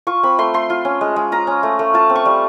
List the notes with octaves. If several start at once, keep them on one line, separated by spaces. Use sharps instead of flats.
F4 C#6
C4 B5
A3 C6
A3 C6
F4
C#4
G#3
G#3
F4 A#5
C#4
A3
A3
F4 A5
C4
C#6
G3